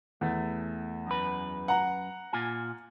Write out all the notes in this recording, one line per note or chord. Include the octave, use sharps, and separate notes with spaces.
E2 A3
F#2 B4
F#5 A#5
A#2 F4 G#5